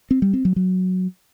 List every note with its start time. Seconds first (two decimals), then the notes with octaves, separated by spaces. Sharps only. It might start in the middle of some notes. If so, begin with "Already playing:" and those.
0.11 C4
0.22 G3
0.33 C4
0.45 F#3
0.56 F#3